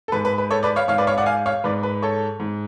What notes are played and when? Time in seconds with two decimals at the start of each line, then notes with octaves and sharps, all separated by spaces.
0.08 A4
0.12 G#2 B4
0.25 B4
0.38 B4
0.51 A4 C#5
0.63 B4 D5
0.76 C#5 F5
0.88 G#2 C#5 F5
0.98 B4 D5
1.07 C#5 F5
1.18 D5 F#5
1.26 F5 G#5
1.46 C#5 F5
1.64 G#2 B4 D5
1.83 B4
2.02 A4 C#5
2.40 G#2